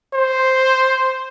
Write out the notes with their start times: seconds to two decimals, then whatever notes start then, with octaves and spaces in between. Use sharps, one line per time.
0.14 C5